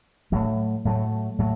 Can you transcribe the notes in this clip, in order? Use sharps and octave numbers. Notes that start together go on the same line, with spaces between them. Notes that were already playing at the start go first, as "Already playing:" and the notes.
A2 F#3 A3
A2 F#3 A3
A2 F#3